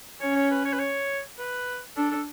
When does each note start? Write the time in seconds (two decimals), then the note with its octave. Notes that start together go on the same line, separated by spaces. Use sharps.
0.21 C#4 C#5
0.36 C#5
0.51 B4
0.65 C#5
0.73 B4
0.79 C#5
1.39 B4
1.97 D4 A4
2.11 A4